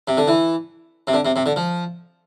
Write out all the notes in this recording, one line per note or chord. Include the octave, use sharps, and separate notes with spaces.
C3
D3
E3
C3
D3
C3
C3
D3
F3